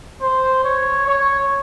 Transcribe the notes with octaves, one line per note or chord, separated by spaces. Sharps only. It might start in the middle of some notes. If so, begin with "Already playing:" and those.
C5
C#5
C#5